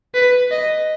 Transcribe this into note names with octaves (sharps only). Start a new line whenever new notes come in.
B4
D#5